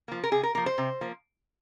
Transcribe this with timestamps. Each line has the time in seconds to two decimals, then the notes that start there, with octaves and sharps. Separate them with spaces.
0.08 F3 A#3
0.24 A#4
0.31 C3 G#4
0.43 A#4
0.55 F3 A#3 A#4
0.66 C5
0.78 C3
1.01 F3 A#3